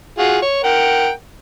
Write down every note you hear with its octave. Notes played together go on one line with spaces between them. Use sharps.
F4 F#4 G#4
C#5
A#4 F#5 G5